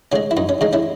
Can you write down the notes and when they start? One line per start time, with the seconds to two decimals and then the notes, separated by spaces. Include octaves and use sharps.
0.12 C#3 G#3 C#4
0.31 E4
0.37 F#2 D#4
0.49 C#4
0.61 C#3 G#3 D#4
0.73 C#4 E4